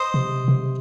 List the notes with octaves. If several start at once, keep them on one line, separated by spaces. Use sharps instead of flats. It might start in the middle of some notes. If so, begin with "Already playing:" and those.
Already playing: C5 D#5
C3
C3